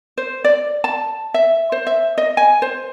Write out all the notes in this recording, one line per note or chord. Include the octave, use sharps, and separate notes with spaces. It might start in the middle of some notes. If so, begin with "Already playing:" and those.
C5
D5
A5
E5
C5
E5
D#5
G#5
C5